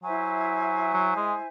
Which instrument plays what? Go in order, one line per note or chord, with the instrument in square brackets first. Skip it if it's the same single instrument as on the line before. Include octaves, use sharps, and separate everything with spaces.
[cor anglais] F#3 [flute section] E4 C5 E5 G#5
[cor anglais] F#3
G#3